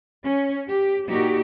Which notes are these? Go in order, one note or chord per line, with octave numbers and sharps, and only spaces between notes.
C#4
G4
A#2 D#4 F#4 G4